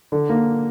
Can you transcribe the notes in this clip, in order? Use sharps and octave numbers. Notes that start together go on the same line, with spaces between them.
D3
A#3